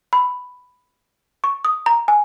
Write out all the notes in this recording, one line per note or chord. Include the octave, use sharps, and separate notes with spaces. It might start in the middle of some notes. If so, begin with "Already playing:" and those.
B5
C#6
D#6
A#5
G#5